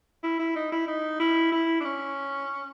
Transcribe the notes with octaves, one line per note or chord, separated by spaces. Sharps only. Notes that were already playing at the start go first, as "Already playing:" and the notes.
E4
E4
D#4
E4
D#4
E4
E4
D4
C#4